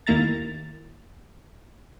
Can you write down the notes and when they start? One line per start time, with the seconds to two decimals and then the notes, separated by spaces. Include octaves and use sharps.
0.07 D#2 D#3 A#3 E4 A#5 A6